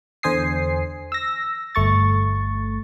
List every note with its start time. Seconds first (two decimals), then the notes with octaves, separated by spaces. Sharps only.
0.23 E2 D3 C5 G#5 D#6 C7
1.12 E6 A#6
1.75 G1 A3 C#6 A6